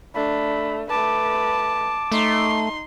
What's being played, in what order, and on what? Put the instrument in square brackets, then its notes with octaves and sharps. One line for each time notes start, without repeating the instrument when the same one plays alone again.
[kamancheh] A3 [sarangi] D4 [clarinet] B5
[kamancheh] A3 B4 [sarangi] A5 [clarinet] D6
[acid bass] A3 [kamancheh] D#4 C6